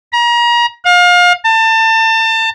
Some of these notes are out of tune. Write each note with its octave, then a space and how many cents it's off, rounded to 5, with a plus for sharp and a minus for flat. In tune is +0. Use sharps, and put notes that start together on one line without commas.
A#5 +35
F5 +30
A5 +30